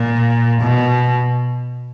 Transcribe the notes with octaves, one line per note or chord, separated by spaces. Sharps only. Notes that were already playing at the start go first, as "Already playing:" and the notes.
Already playing: A#2
B2